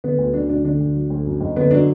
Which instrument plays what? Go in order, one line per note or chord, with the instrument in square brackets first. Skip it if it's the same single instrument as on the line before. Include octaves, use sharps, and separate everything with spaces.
[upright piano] D3 B3
D2
F#3 D4
D2 D4
D3 D4
D2
F#3
D2
F#2
F#1
D3 B3
F#3 D4